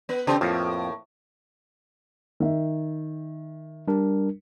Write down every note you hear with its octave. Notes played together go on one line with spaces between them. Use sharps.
B3 B4
C#3 C4 G4 C5 A5
F2 A2 F3 A#3
D#3 E5
G3 D4 A#4